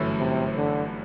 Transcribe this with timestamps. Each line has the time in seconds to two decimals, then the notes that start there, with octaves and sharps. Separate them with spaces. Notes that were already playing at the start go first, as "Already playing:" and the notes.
Already playing: G1 F#2 E3 A3 E4
0.19 C3
0.57 D3